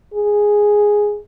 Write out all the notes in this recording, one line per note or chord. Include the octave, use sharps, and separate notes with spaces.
G#4